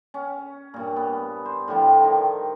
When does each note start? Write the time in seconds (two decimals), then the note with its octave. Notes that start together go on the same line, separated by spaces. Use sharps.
0.14 C#4
0.74 G2 A#2
0.96 B3
1.45 C5
1.68 A2 D3 F3 G3
2.04 D#3